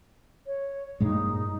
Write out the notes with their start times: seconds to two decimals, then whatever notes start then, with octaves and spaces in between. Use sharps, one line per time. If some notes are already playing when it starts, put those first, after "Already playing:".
0.47 C#5
1.00 G2 A#2 G#3 D#4